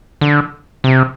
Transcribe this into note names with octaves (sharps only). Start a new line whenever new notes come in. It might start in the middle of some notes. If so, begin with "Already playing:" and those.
D3
C3